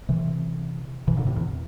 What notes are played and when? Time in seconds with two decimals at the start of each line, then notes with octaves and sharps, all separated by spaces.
0.09 C3 E3
1.08 C3 E3
1.17 A#2 D3
1.27 A2 C3
1.36 E2